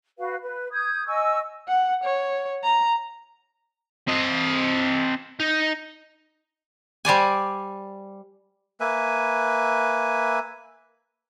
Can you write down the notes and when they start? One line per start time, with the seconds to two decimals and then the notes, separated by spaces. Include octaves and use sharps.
0.19 F#4 B4 F5
0.43 B4
0.72 D#6 G6 G#6
1.07 D#5 G#5 C#6 E6
1.68 F#5
2.04 C#5
2.63 A#5
4.08 C4 D#5
5.40 D#4
7.05 G3 C5 D5 G#5
8.80 A#3 B4 E5 G#5